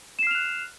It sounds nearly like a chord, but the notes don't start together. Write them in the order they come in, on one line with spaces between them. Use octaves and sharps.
E7 C7 F6 F7 F#6